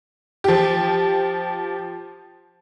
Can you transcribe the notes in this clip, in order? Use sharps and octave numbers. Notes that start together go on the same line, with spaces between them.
F3 G4